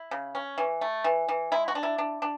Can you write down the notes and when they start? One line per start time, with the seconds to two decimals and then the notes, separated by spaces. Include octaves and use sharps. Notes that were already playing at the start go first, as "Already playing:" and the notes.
Already playing: E4
0.11 C#3
0.35 C#4
0.58 E3
0.81 A3
1.04 E3
1.29 E3
1.52 G#3 E4
1.68 F#4
1.75 D4
1.83 E4
1.98 D4
2.22 D4